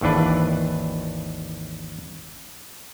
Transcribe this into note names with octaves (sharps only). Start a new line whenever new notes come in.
G#1 D#2 E3 D4 B4